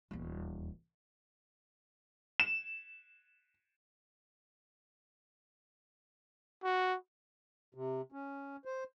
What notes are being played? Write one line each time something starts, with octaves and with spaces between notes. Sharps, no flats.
D#1 E2
E7
F#4
C3
C#4
C5